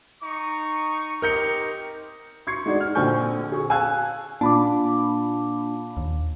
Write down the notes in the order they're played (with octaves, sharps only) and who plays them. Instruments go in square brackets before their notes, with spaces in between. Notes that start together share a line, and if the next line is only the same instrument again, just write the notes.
[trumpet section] D#4 C#6
[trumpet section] C4 D#4 G4 [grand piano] A#4 G6 C#7
[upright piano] C6 C#6 G#6 C7 C#7
G#3 D#4 F#4 D5
F6
A#1 D3 C4 G#5 C#6 G6
G#4 C#6
F5 G#5 A5 E6 F#6 G#6
[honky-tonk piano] A#2 [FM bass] D4 [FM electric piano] A5 B5 D6
[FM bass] D#2